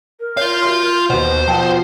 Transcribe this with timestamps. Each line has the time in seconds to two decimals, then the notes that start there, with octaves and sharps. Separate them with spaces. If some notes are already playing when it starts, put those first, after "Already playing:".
0.20 A#4
0.37 F4 C#5 F5 G6
0.63 F#4 E5 C6
1.10 D#2 B2 F#4 C5 F#5 C6
1.48 B2 F3 A#4 F#5 G5 A5